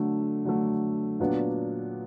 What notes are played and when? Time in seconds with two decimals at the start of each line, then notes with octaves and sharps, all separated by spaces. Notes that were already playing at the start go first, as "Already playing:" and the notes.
Already playing: D3 F#3 A3
0.45 D3 F#3 A3
1.20 A#2 F#3 B3 D4